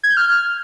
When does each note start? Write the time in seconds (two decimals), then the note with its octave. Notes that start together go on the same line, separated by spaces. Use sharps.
0.03 G#6
0.10 G6
0.17 F6